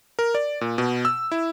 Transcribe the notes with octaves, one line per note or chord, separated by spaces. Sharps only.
A#4
D5
A#2
B2
E6
E4